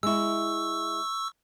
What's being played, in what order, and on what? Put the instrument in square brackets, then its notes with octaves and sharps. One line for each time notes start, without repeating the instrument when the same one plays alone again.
[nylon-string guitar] G#3 E4 [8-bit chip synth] C#6 E6